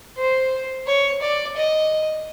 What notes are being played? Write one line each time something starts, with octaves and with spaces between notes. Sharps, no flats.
C5
C#5
D5
D#5